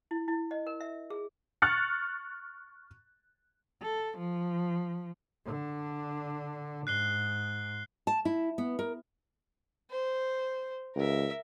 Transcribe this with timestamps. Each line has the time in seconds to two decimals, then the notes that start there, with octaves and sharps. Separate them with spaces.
0.11 E4
0.28 E4
0.51 D#5
0.67 A#4
0.80 E5
1.10 G#4
1.62 C#6 F6 F#6 A6 C#7
3.82 A4
4.18 F3
5.45 D3 D4
6.87 G#2 F#6 C7 G7
8.07 A5
8.25 E4
8.58 B3
8.79 A#4
9.91 C5
10.96 C#2 A#4 E5